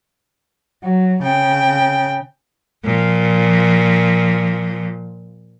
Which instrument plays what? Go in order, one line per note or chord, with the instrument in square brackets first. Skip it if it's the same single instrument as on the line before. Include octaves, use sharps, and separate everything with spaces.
[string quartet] F#3
C#3 G5
[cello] A#2 F3